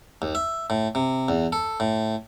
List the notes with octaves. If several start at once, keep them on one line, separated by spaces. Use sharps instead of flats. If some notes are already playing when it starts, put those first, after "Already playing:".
D#2
E5
A2
C3
E2
A4
A2